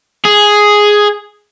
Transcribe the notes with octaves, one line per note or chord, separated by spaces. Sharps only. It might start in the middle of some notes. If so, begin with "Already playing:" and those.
G#4